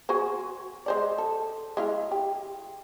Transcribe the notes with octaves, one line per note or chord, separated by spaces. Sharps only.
F#4 G#4 C5
G#3 C5 D5
A4
G#3 E4 F5
G4